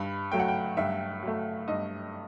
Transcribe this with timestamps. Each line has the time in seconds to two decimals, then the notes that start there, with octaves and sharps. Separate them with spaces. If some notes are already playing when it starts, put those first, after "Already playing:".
Already playing: G2 B5
0.32 F#3 A3 G5
0.40 F#5
0.48 G5
0.77 G2 E5
1.23 F#3 A3
1.68 G2 D#5